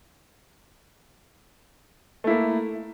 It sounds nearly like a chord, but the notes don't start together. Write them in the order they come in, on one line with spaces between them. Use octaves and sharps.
A3 E4 A#3